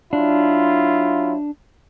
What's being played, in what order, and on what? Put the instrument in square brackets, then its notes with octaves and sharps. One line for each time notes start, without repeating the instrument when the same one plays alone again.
[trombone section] F#3 E4 F4 [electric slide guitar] D4